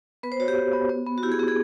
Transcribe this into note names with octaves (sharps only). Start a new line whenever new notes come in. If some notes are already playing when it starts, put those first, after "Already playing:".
B3 B4
C5
F#4 C#5
G4
B3
B3
B3
B3
F#4
E4 G4
G#4
B3 G4
G#4